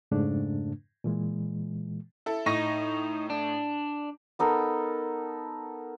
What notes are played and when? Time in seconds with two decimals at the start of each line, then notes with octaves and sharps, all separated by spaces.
0.11 F2 G#2 C#3 A3 D4
1.04 A#2 E3 G#3
2.26 E4 A4
2.46 A2 D#4 C#6 A#6
3.30 D4
4.39 B3 D#4 A4 A#4